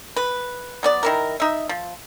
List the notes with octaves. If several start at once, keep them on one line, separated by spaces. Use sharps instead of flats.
B4
F#3 B3 D5
D#3 E4 A#4
D#4 E5
F3